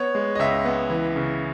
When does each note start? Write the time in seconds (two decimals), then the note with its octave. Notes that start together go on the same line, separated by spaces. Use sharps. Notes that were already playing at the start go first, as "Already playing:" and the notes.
Already playing: B3 C#5
0.15 G#3
0.35 D#5
0.39 C#2 E5
0.65 B3
0.90 E3
1.16 C#3